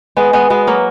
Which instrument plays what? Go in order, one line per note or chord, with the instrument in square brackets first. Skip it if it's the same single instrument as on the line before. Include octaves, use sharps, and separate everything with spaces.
[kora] G#3 B3 [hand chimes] B4
[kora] G#3 B3
[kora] G#3 B3 [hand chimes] F#4
[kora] F#3 A#3